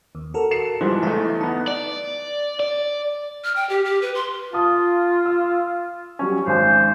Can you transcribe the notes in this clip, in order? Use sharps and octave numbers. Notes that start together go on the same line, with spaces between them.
D#2
F#4 A4 A#4
C7 C#7 E7
G#2 E3 F3 G3
E2 A3 E4
B3 D#4 A5
D5
D5
F6
G5
G4
G4
B4
C6
F4 A5 D#6
E6
F#3 G3 C#4
G#1 C5 G#5